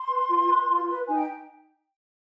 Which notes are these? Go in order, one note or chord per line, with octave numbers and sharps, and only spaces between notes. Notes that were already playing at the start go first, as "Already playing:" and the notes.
Already playing: C6
B4
F4
B4
F4
B4
D#4 G#5
G5